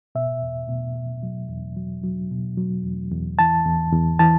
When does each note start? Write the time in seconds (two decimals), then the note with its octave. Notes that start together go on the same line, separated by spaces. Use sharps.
0.15 B2 E5
0.42 E2
0.69 B2
0.96 B2
1.23 F#3
1.49 E2
1.76 F#3
2.04 F#3
2.31 B2
2.57 F#3
2.84 E2
3.11 E2
3.39 E3 A5
3.65 E2
3.92 E2
4.19 E3 A5